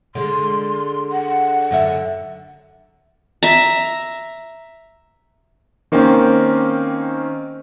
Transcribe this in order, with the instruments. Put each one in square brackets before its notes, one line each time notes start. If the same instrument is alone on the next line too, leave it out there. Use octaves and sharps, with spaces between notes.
[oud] D3 G#3 [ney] C6
[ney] F#5
[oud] F#2 D3 E5
[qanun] E5 A#5
[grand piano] D#3 A#3 C4 C#4 C5